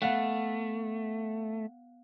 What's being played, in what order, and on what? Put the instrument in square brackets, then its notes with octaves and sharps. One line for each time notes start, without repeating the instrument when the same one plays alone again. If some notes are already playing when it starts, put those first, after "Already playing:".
[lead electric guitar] A3 [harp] B3 F5 F#5